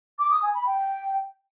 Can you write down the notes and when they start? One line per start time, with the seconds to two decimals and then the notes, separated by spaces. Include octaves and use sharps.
0.19 D6
0.31 D#6
0.43 G#5
0.54 B5
0.66 G5